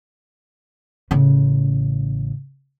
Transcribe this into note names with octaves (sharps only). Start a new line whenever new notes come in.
A1 C#3